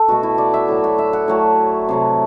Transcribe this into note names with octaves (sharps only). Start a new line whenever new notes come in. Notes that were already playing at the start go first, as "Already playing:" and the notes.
Already playing: A4
B2 A3 F#4
E4
D5
E5
A2 F#3 A3
F#5
E5
F#5
A2 F#3 A3
C3 F#3 A3